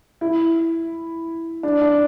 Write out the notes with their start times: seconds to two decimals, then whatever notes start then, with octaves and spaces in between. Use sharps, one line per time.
0.21 E4
1.63 D4
1.82 D4